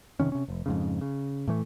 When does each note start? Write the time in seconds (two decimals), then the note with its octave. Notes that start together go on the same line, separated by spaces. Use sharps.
0.20 F#1 C3 D#3 C#4
0.32 C3 C#4
0.48 F1
0.66 F2 G#2 C#3
1.01 C#3
1.47 A2 E3 A3